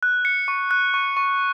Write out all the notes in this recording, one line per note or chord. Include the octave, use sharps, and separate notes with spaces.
F#6
C#7
C#6
F#6
C#6
C#6